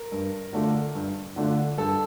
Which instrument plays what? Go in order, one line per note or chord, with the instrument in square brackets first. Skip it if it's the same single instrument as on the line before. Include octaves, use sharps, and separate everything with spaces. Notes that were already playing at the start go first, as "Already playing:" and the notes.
Already playing: [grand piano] A#4
[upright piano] G2
D3 A3 D4 F4
G2
D3 A3 D4 F4
[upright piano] G2 [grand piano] A4